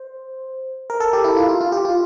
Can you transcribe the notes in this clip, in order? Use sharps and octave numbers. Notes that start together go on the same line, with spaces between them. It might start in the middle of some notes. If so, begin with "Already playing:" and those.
Already playing: C5
A#4
A4
G4
E4
F4
F4
F4
G4
F4